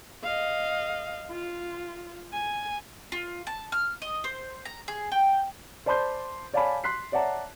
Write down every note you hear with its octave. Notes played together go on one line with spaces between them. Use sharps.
D#5 F5
F4
G#5
F4
A5
F6
D#5
C5
A#5
G#4
G5
C5 D5 A5 B5 C6 G6
C#5 D5 F5 G#5 A5 B5
C6 F#6 B6 C7
C#5 D5 E5 F#5 A5 A#5